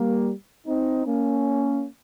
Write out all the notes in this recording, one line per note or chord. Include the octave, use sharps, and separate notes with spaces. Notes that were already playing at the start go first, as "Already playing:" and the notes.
Already playing: G3 A#3
C4 D#4
A#3 C#4